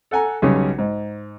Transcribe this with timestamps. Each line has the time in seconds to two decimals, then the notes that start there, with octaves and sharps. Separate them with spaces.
0.11 A4 F#5 G#5 A#5
0.42 B1 C#3 G3 C#4
0.78 G#2